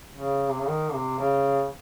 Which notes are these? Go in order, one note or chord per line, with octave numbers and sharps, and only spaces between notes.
C#3
C3
C#3
D#3
C3
C#3